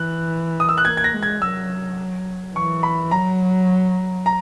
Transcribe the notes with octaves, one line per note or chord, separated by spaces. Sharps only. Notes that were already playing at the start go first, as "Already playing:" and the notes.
Already playing: E3 F#6
D#6
E6
F#6
A#3 G#6
G#6
A#6
G#3
G#6
F#3 E6
E3 C#6
B5
F#3 A#5
A#5